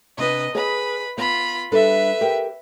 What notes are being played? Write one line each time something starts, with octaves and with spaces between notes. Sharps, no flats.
C3 D4 B4 D#5
G#4 B4 D#5 B5
B3 F4 B5
G3 D4 A4 B4 E5
G4 A#4 G5